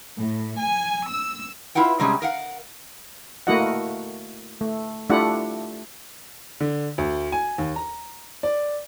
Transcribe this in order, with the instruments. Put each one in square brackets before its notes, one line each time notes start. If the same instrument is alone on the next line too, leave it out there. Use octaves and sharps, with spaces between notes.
[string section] A2
G#5
E6
[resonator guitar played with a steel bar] E4 F4 B4 F#5 G5
C3 G3 G#3 C#4 G#4
A#4 F5 F#5
[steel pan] A3 A#3 E4 F#4 D#5 F#5
A3
A3 D4 E4 F4 G4 F#5
[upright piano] D3
D2
G#5
D#2
A#5
D5